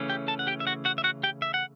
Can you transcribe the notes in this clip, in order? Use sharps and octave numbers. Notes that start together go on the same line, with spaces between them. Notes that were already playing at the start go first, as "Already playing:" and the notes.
Already playing: C#3 E3 A3 C#4
G4 G5
A4 A5
F#5
G4 G5
E5
F#4 F#5
F#4 F#5
E5
F#4 F#5
G4 G5
E5
F#5